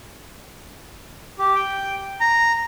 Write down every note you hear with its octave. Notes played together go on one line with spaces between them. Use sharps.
G4
G5
A#5